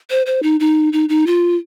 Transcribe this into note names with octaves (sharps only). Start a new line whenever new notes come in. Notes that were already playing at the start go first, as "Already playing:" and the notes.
C5
C5
D#4
D#4
D#4
D#4
F4